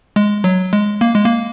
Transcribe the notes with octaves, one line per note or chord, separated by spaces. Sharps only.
G#3
F#3
G#3
A#3
G#3
A#3